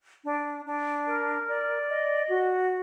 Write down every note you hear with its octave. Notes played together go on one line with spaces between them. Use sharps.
D4
D4
A#4
D5
D#5
F#4